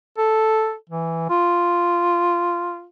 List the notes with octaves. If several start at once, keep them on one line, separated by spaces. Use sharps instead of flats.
A4
E3
F4